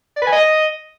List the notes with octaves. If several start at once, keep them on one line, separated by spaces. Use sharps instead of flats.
D5
B4
G#5
D#5